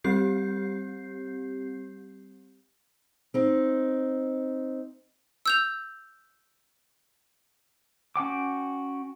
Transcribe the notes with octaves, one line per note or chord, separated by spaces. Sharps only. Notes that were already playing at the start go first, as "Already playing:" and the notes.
G3 C4 G4 G6 C7
C4 D#4
E6 G6 F7
C#4 F#4 G5 D6